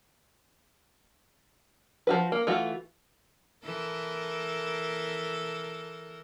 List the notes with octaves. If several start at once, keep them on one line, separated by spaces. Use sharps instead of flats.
F3 F#4 B4
A#3
E3 A3 F4 F#4
E3 A4 A#4